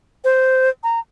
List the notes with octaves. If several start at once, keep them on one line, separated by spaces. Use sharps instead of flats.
C5
A#5